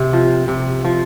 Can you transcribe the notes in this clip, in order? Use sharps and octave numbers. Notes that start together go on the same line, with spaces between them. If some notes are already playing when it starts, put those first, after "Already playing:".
Already playing: C3
F3
C3
F3